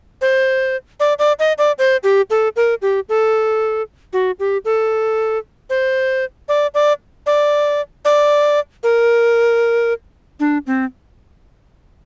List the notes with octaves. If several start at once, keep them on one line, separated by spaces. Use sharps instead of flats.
C5
D5
D5
D#5
D5
C5
G4
A4
A#4
G4
A4
F#4
G4
A4
C5
D5
D5
D5
D5
A#4
D4
C4